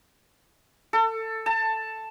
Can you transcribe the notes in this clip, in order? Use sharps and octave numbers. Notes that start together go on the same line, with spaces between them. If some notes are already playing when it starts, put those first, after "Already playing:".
A4
A5